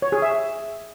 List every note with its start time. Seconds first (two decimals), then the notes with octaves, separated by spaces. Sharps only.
0.02 C#5
0.12 G#4
0.22 E5